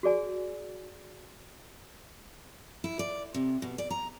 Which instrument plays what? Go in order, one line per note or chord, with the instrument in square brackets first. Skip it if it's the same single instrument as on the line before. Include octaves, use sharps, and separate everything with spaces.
[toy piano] F#4 G#4 D5 G#5
[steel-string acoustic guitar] E4
D5
C3
B2
D5
A#5